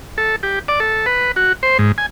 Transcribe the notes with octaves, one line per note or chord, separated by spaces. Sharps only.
A4
G4
D5
A4
B4
F#4
C5
G#2
G#5